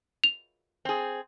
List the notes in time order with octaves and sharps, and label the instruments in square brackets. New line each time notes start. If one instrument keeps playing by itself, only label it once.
[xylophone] F7
[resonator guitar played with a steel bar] C4 G#4